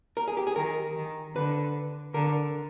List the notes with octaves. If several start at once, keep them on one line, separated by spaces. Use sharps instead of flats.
A#4
G#4
G4
G#4
D#3 A#4
D#3
D3 B4
D3 A#4